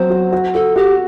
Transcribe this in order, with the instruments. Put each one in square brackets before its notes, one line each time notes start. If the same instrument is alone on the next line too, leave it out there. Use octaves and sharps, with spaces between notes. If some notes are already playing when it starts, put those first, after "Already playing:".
Already playing: [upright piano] F#3 C4 [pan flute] C5
[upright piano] F#4
F#4
[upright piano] F#4 [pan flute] A4
[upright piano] F#4 [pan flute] G4